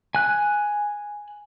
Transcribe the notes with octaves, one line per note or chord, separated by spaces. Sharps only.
G#5 F#6